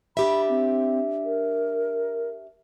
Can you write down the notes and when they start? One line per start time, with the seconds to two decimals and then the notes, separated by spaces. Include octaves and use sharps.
0.17 D4 G4 E5 B5
0.49 C4
1.25 A#4